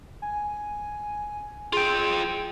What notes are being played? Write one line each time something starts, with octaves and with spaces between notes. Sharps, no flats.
G#5
F4 G#4 G5